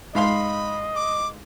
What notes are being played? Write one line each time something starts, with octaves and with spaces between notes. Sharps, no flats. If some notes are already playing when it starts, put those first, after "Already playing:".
G#2 D#5 F5 B5 C6
D6